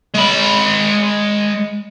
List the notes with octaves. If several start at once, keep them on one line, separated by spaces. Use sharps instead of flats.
G#3 B5